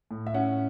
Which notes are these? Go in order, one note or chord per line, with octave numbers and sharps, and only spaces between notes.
A2
E5
C#4 F#5